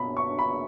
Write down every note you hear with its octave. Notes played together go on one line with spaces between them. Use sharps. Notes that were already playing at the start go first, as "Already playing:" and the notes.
Already playing: B2 B5
C#6
B5